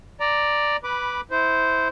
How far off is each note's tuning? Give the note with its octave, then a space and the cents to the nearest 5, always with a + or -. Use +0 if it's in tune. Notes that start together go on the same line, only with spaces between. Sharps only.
D5 +5 A#5 +0
B4 +0 B5 -15 D6 +0
E4 -20 C5 -10